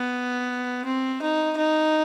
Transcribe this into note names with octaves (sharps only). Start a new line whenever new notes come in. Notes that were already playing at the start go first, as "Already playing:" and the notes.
Already playing: B3
C4
D#4
D#4